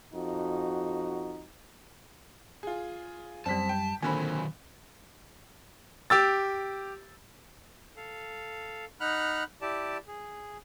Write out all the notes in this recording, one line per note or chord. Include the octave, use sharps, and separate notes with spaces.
F2 D#4 F#4
F4 G#4
F#2 G3 C4 A5 B6
G5
A#2 D3 D#3 F#3 C4 G#5 B5
G4 E6 A6
A4 F5
D#4 F#5 B5 F6 F#6
E4 G4 D5 A5
G#4